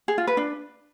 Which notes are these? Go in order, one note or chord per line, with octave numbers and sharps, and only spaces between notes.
G#4
F4
B4
D4